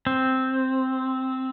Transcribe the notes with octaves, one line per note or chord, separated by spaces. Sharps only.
C4